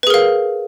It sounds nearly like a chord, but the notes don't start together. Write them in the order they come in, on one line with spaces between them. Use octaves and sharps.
B4 G#4 A#4 F5